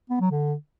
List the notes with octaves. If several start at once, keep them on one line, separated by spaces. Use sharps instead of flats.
B3
F#3
D3